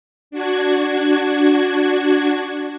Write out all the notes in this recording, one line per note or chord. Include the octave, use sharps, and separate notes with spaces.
D4 F#4 G#6